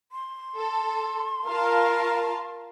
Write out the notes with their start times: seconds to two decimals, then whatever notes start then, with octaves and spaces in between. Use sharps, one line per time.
0.12 C6
0.58 A4
1.46 F4 A#4 F5 A5